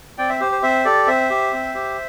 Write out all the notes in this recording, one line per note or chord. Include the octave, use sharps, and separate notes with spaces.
C4 D5 G5
C5 E5
G4 C5
C5
C4 C5 E5
G4 A4 D5
C4 C5 E5
G4
C4
G4